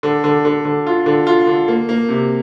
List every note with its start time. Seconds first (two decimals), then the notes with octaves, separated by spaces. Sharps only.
0.03 D3
0.24 D3
0.45 D3
0.65 D3
0.87 F4
1.06 D3
1.27 F4
1.47 D3
1.68 A#3
1.89 A#3
2.09 C3